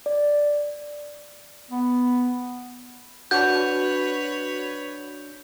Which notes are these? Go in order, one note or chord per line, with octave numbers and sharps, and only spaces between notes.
D5
B3
D4 F#4 B4 C#5 G6